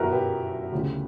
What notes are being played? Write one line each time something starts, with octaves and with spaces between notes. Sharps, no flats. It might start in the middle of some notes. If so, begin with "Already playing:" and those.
Already playing: G1 F#2 E3 E4 F#4 G4 A#4 B4
G4 B4
D2 C#3 E3 G3